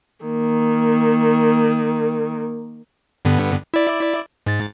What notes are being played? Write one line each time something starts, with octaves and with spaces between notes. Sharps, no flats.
D#3 A#3
G2 D3 B3
E4 D5
G#2 A6